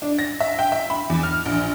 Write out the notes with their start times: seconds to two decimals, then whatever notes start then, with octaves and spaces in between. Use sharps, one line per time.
0.02 D4
0.19 A#6
0.41 E5
0.59 G5
0.72 E5
0.90 B5
1.10 E2
1.23 F6
1.46 A#1